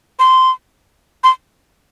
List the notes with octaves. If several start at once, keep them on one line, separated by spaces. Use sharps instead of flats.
C6
C6